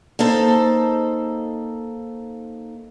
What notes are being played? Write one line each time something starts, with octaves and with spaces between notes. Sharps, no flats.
A#3 D#4 A4 C5